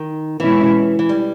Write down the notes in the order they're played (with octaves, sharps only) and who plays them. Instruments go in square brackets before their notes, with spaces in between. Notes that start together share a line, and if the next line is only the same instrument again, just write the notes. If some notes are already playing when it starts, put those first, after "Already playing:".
Already playing: [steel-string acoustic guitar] D#3
[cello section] B2 G#3 C#4 E4 [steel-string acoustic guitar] E3
[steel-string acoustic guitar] E3
G3